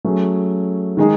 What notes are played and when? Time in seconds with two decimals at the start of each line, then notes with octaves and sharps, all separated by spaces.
0.05 F#3 A3 C#4 G#4
0.97 D#3 G#3 D#4 G#4